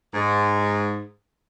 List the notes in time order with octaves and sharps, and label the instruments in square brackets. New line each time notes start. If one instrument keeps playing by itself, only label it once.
[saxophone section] G#2